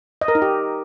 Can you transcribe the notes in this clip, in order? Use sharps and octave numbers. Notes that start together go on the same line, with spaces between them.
D#5
A#4
D#4
G4